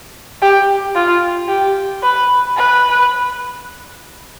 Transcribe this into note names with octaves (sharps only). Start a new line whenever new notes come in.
G4
F4
G4
B4
B4